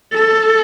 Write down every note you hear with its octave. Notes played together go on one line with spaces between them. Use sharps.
A4